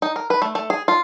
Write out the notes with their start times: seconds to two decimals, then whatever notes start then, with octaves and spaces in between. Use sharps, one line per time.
0.02 D#4
0.16 A#4
0.30 B4
0.42 A3
0.55 A3
0.70 G#4
0.88 F4